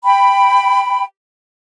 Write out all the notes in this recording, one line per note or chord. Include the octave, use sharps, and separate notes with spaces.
G5 B5